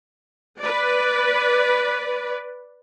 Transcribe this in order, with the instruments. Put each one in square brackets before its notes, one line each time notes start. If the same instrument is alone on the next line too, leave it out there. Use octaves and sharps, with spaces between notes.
[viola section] B4 D5